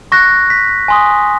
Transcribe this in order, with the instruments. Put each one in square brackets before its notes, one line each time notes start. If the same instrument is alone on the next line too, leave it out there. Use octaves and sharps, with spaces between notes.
[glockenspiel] C#6 F#6 A#6
B6
G#5 C6 D#6